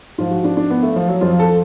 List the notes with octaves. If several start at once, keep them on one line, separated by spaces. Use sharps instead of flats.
G#2 F3 F4
F#4
D4
D4
B3
A3
F3
F#3
F2 F3 F4
A4